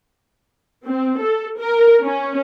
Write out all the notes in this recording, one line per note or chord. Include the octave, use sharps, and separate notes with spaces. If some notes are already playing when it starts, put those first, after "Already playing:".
C4
A4
A#4
C#4